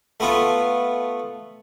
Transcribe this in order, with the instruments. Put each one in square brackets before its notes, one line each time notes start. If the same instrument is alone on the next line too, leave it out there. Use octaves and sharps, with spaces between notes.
[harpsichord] A3 B3 F4